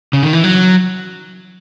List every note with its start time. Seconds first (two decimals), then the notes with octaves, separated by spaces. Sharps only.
0.13 C#3
0.23 D#3
0.33 E3
0.44 F#3